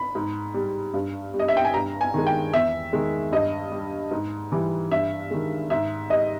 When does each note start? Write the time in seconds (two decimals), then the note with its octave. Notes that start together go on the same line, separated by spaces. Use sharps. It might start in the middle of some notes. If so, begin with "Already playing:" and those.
Already playing: B5
0.15 G#2
0.54 G3
0.94 G2
1.34 G3
1.39 D#5
1.48 E5
1.57 G5
1.65 G#5
1.74 G2 A#5
2.01 G#5
2.14 D#3 G#3
2.27 G5
2.53 E2 E5
2.93 D#3 G#3
3.32 G2 D#5
3.72 G3
4.11 G#2
4.52 E3 G3
4.91 G2 E5
5.31 D#3 G#3
5.70 G#2 E5
6.10 G3 D#5